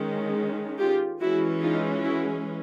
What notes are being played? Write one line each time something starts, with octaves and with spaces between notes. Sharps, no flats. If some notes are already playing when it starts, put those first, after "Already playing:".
Already playing: D#3 G#3 C#4
F4 G4
E3 G#3 C#4 E4 F#4
D#4 F4
E4 F#4